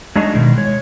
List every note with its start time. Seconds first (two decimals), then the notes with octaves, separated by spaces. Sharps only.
0.16 F#3 G#3 D4 D#4 F#4 G#4
0.32 B2 D#3 G#3 E4
0.57 G#3 C#5